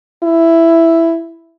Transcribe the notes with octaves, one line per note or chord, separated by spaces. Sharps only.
E4